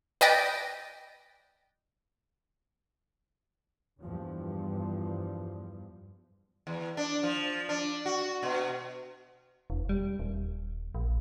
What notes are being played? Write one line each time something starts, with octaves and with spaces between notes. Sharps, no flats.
B4 D5 D#5 G5
E2 G2 F3
E2
D4
F3
D4
F#4
B2
E1
G3
D#1
A#1